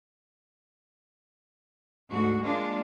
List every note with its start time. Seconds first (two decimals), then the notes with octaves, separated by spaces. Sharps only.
2.10 D2 G#2 F#4
2.43 G#3 A#3 D4 F4